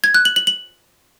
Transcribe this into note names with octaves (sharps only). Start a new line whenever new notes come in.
G#6
F#6
F#7
F#7
F#7